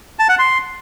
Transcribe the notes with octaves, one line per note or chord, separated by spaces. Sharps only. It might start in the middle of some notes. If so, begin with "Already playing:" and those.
A5
F#5
C6